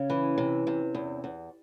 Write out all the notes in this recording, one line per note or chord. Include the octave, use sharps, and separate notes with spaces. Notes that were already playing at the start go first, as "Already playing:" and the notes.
Already playing: C#3 C#4
E3
C3
C3
E2
E2